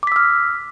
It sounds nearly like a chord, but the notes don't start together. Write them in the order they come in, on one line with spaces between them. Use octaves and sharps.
D6 B6 E6 F6